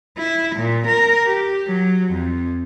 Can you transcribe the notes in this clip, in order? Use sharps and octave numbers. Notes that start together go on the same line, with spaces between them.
E4
A#2
A#4
G4
F#3
F2